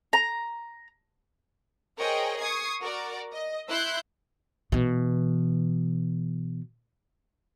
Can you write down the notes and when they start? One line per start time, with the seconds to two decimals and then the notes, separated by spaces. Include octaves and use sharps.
0.13 A#5
1.98 G#4 A#4 C5 C#5 D#5 G5
2.40 C#6 D#6 G#6 C7
2.80 F#4 A#4 D5
3.32 D#5
3.68 E4 C6 E6 F#6 G6
4.72 B2 E3